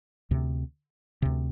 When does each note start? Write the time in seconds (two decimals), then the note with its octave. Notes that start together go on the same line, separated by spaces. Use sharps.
0.31 D2 C3
1.22 D2 C3